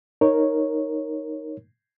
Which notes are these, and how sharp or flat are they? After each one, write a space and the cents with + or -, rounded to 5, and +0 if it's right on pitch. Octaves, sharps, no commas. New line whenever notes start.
D#4 +0 A#4 +0 C#5 -10